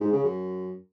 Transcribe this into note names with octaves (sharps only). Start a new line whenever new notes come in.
G#2
C#3
F#2